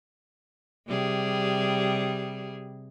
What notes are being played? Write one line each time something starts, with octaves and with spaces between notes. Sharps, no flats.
C3 G3 G#4